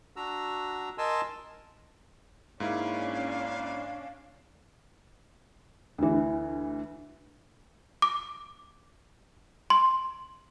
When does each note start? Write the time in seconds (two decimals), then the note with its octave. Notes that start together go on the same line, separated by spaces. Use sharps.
0.16 D4 F#4 A#5 E6
0.98 A#4 D#5 G#5 A5 C6 E6
2.60 G#2 A#3 C#4 D4 E4 F5
5.98 D2 E3
8.02 D6
9.70 C6